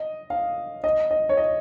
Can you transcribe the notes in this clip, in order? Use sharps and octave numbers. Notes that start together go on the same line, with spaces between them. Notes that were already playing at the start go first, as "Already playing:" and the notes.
Already playing: D#5
F5
D#5
D#5
C#5
D#5